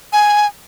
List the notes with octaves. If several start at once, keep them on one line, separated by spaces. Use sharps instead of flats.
G#5